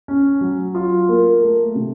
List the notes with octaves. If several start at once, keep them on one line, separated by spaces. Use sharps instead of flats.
C#4
F#3
F4
A#3
A3
C3